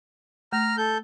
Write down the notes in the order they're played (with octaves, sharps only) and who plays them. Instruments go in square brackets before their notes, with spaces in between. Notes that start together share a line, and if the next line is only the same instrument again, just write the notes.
[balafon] A3 [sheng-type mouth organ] A#5 F6
[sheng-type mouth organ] A4 G6